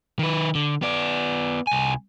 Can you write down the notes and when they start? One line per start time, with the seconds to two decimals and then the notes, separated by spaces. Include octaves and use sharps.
0.19 D#3 B4
0.55 D3
0.82 B3 D5
1.67 C2 G#5